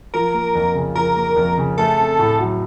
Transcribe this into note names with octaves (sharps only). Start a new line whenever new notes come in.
F3 A#4
A#3
F2
C#3
F3 A#4
A#3
F2
C#3
A3 A4
C4
A2
F#3